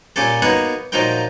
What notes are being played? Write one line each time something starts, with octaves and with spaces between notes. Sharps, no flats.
A#2 C#4 G4 A4
A#3 B3 D#4 F#4 C#5 F#5
A#2 F3 F#3 D#4 A#4 G5